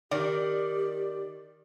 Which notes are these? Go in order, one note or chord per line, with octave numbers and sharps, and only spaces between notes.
D#3 G4 D5